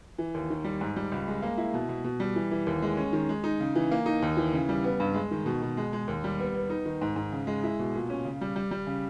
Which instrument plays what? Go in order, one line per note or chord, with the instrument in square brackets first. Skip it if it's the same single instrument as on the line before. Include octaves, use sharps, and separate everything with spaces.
[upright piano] E3
D#2
D#3
G3
G#2
G3
C#2
G#3
A#3
E4
B2
B2
B2
G3
E3
E3
D#2
G#3
C#4
D#3
G#3
D#4
C#3
E3
A#3
D#4
D#2
E3
C#3
G3
B3
G2
G#3
D#3
B2
B2
G#3
G#3
D#2
G3
B3
B3
D#4
D#3
G#2
G#2
C#3
G#3
E4
B2
A#2
C#4
C#3
G3
G3
G3
C#3